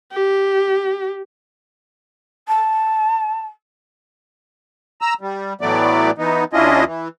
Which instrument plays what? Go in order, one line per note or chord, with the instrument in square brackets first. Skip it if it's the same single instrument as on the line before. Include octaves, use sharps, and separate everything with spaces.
[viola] G4
[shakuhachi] A5
[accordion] A#5 E6
G3
A2 E3 F#3 A3 B3 D5
E3 B3 D#4
D#2 C#4 D4 E4 F4 D#5
E3